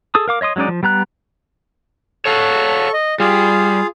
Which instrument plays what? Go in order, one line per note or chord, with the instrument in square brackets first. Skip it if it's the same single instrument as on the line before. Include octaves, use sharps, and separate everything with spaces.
[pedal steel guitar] G#4 A4 D#6
A#4 F5 D6
C#5 D#5 C6 D#6
F#3 G#3 C#4 D#4 D5
F3
G3 B3 A#5 F#6
[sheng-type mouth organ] A4 C#6 [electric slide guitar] C#5 F5 F#5
[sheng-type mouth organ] D#5
[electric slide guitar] G3 [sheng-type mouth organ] F4 G#4 F5